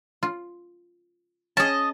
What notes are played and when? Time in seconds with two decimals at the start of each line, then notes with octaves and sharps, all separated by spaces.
0.23 F4
1.57 C#4 G#4 D#5 A5